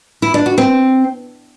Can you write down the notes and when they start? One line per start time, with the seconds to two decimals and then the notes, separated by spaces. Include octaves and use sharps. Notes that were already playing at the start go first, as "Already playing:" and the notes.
0.22 E4
0.34 D4
0.46 F#4
0.58 C4